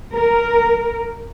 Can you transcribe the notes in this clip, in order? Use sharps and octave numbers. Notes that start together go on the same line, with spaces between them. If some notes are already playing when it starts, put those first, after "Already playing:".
A#4